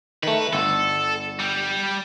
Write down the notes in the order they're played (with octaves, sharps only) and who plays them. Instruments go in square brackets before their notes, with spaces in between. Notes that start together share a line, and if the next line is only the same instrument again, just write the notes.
[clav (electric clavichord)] D#3 A3 [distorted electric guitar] B4
[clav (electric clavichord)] G1 [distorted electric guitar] A4
[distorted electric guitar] G3